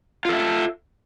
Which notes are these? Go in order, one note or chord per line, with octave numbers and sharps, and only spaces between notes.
F4 A4 E5